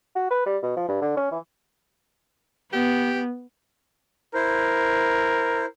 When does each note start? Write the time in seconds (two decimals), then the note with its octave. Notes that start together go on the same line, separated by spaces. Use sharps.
0.16 F#4
0.31 B4
0.46 G3
0.63 B2
0.77 F3
0.89 G2
1.02 D3
1.17 C#4
1.32 E3
2.73 B3 G4
4.34 E4 A#4 C5